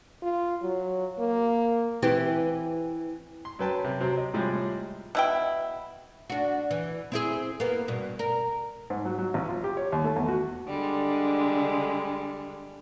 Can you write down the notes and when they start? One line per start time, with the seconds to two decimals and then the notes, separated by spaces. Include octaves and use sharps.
0.23 F4
0.63 F#3
1.19 A#3
2.02 E3 C4 G4
3.45 C6
3.59 F#2 F#3 B4 G5 A5
3.84 C3
4.00 C3 F#3 C4
4.17 D#5
4.34 A2 C3 F3 G3 G#3
5.15 B2 E4 G5
6.30 D4 F#4
6.71 E3
7.12 C4 E4 G#4
7.60 A#3 B3
7.88 G2 B2
8.19 A#4
8.90 G#2
9.05 F#3
9.18 F#3
9.34 A1
9.48 F4
9.64 G4
9.77 C#5
9.92 D#2
10.04 A3
10.16 E2
10.28 F#4
10.66 D3 G3 G#3